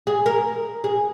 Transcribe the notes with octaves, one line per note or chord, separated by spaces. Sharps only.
G#4
A#4
G#4